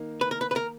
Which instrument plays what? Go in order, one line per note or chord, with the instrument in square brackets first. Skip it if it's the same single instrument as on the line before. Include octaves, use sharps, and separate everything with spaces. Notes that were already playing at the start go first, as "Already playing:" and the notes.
Already playing: [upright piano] D#3 A#3 D#4 A#4
[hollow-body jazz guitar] B4
A#4
B4
B4
A#4